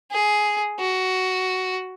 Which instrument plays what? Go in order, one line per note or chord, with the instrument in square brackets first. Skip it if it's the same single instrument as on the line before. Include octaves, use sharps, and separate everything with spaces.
[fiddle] G#4
F#4